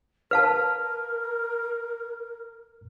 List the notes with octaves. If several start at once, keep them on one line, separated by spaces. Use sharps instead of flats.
A#4 B4 F5 A5 F6